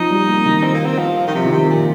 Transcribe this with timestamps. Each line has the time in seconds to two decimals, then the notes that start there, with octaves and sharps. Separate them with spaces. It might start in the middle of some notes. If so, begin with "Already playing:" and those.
Already playing: F3 D#4
0.10 G3
0.27 A#3
0.45 D#3
0.63 C4
0.74 A#3
0.85 C4
0.98 F3
1.27 D#3
1.34 C3 F3
1.44 D#3
1.51 C3 F3
1.70 A#2